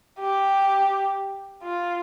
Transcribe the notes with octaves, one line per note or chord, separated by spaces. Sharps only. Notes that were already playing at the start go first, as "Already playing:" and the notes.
G4
F4